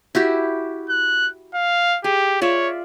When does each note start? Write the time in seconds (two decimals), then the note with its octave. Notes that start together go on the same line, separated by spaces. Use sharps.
0.15 E4 F#4 G4
0.90 F#6
1.54 F5
2.04 G4 G#4
2.41 F4 C#5 D5 E5